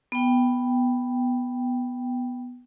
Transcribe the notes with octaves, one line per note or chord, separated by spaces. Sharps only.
B3 G5